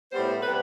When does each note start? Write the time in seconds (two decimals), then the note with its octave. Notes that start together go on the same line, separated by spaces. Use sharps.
0.12 A2 G3 B3 C5
0.42 C3 G3 B3 B4